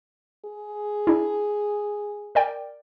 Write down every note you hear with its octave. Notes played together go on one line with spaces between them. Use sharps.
G#4
D4 E4
A#4 D5 G5